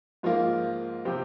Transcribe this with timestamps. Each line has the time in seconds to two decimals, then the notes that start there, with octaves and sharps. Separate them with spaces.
0.23 G#2 F3 A#3 F4
1.05 C3 F3 C4 G4